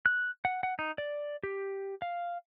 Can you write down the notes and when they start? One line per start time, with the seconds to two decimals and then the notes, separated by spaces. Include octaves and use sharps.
0.06 F#6
0.45 F#5
0.63 F#5
0.79 D#4
0.98 D5
1.43 G4
2.02 F5